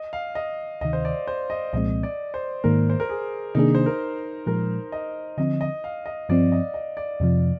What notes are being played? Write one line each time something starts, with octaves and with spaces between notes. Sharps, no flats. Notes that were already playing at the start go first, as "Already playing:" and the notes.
Already playing: D#5
F5
D#5
D2 C3 D#3 D#5
C5
D5
C5
D#5
C2 A#2 F3 G#3 C4 D#5
D5
C5
G#2 D#3 A#3 A#4
C5
A#4
G#4
C3 D#3 A#3 D4 D#4 G#4
C5
A#4
A#2 F3 G#3 A#4
D#5
D3 F3 C4 D#5
D#5
F5
D#5
G2 F3 C4 D5
D#5
D#5
D5
F2 C3 F3